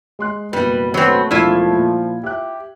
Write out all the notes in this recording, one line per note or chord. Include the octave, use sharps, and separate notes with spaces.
G#3 C6 F#6
F#1 B2 G3 B4
F#3 A3 C4 B4 C5
E1 F3 E4 F4 D5 G#6
A#2
G4 E5 F#6